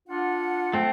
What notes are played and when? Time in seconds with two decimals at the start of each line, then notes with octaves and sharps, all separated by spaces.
0.07 D4 F4 F#5
0.73 A3 C4